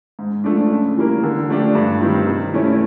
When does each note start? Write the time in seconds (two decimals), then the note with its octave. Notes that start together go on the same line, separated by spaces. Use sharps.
0.19 G#2
0.44 F3 A3 D4
0.70 C#3
0.97 E3 G3 A#3
1.23 D3
1.49 F3 A3 D4 G4
1.75 G2
2.01 D#3 G3 C4
2.27 C3
2.54 E3 A3 C#4 E4